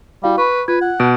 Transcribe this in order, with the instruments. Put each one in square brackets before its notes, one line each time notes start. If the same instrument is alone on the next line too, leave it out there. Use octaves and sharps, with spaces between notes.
[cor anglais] G3 [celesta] E4 F#4 F5
[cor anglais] B4 [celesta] B5 C#6
[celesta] F4 G#6 [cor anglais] B4
[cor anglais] F#5
[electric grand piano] B2 [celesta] D7